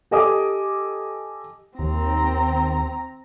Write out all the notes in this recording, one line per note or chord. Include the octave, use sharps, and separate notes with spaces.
G4 A4 D#5 G#5 D6 D#6
D#2 C4 A#5